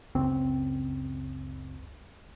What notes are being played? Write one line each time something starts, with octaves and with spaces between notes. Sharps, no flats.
F#1 C#2 C4